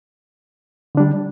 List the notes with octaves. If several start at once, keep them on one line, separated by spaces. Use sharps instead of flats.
D3 G3 D4